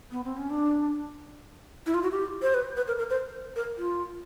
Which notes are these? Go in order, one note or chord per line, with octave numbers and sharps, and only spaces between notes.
B3
C4
C#4
D4
E4
F4
F#4
G4
C5
B4
B4
A#4
A#4
C5
A#4
F4